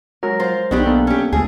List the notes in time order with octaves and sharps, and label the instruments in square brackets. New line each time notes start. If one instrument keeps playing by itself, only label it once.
[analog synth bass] F#3 [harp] G#3 A#4
[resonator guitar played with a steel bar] F4 [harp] C5
[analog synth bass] B1 [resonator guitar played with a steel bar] D#3 D4 G4 [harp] B3
[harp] A#3 B3 A4
[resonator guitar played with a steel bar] C#4 G4
[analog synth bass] D2 [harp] G#3 A3 G#5 [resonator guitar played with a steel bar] G#4